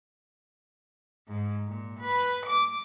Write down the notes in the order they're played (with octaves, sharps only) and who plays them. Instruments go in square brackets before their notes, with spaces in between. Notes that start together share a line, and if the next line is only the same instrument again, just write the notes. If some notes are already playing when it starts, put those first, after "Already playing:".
[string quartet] G#2
A#2
B4
D6